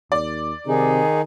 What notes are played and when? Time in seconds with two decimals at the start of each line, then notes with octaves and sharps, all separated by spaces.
0.12 D#2 D5
0.67 C3 D#3 D#4 G#4